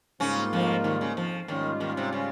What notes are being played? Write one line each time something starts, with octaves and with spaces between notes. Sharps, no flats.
G#2 C#3 G3 A#3 C#4 F4
F2 F3
D#2 D#3
C#3
F2 F3
D#2 G#2 D#3 G3 C#4 F4
D#2 D#3
C3
C#3